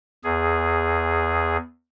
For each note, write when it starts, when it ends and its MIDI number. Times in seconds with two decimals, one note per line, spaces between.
0.24 1.57 40
0.24 1.57 68